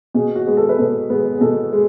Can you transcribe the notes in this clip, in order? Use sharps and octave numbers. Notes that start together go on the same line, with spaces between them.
B2 G#4
F#4
G#3 B3
A4
B4
B2 A4
G#3 B3
G#4
B2 A4
G#3